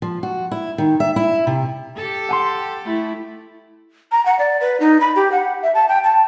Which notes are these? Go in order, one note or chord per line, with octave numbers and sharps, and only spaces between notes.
F3
F#4
E4
D#3
E5
E4
C3
G4 A4
F#5 G#5 C6
A3 E4
A#5
F#5
D5
B4
D#4
B5
G4
F#5
E5
A5
G5
A5